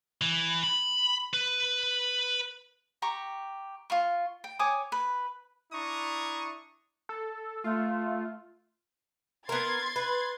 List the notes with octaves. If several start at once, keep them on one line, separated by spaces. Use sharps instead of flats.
E3
B5
B4
G4 A#5 C#6
F4 F5 C#6
G5
C#5 G#5 D6 D#6
B4
D4 E4 A#5 C#6 D#6
A4
A3 F4
B3 A#4 C6 G#6 A6
B4